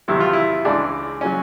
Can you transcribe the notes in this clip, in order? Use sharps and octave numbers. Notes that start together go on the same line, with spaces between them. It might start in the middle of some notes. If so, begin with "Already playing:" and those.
E2 C3 D#3 F#3 E4
F4
E4
C#2 C#3 E3 G#3 D4
C#3 F#3 C#4